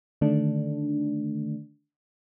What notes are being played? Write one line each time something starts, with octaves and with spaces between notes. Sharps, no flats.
D3 D#3 A3 D4